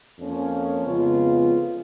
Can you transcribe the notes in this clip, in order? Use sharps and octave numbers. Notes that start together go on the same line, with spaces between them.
F2 F3 A#3 C#4
F2 C#3 G#3 B3 F4